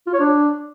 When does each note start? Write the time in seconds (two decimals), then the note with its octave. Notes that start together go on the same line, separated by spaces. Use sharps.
0.07 F4
0.13 C#5
0.20 D4